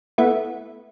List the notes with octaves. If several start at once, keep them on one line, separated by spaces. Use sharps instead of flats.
A3 B3 E4